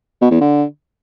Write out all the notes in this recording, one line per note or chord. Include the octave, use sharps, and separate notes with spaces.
B2
E2
D3